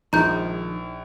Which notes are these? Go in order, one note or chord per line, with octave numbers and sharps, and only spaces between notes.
A#1 D#3 F3 G#3 D#4 E4 A#5 G6